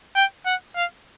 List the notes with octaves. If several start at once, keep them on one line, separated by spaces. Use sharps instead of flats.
G5
F#5
F5